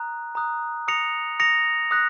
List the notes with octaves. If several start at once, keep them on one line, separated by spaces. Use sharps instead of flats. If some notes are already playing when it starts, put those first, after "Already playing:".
Already playing: A#5 D#6 F#6
A#5 D#6 F#6
D#6 A#6 C#7 F7
D#6 A#6 C#7 F7
D#6 F#6 A#6